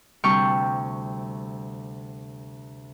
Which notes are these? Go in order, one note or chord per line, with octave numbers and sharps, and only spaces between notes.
D2 C3 G3 G5 C#6 F6